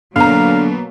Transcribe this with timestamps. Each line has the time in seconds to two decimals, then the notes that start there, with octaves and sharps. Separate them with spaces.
0.16 B2 D3 F#3 A#3 F5 A#5